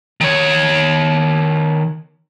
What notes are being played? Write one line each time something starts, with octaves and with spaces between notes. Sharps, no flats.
D#3 C#5